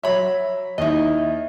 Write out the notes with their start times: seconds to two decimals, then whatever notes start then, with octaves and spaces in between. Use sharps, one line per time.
0.03 F#3 C#5 E5 B5
0.78 D#2 D#3 E4 D#5